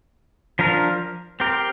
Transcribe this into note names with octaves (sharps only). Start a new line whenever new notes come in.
F3 D4 A#4
C4 G4 A#4